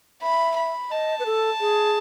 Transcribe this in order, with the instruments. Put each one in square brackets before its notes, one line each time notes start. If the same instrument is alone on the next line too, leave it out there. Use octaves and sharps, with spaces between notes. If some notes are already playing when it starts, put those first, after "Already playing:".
[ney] E5 [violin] B5
[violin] B5
[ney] D#5 [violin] A5
[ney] B4
A4
G#4